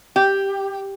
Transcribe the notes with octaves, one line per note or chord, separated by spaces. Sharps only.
G4